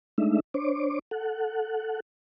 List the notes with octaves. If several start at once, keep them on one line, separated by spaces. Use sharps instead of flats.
G#3 A3 D4 D#4 E5
D4 C5 C#5 D6
A4 F#5